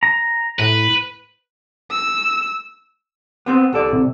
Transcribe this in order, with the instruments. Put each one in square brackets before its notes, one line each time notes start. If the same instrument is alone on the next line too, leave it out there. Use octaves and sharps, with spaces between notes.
[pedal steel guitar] A#5
[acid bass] A2 [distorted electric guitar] B4
[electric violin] E6
[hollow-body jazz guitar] B3 C4 C5
C2 A4 D5
[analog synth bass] C3